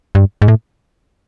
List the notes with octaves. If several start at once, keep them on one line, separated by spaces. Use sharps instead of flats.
G2
G#2
A2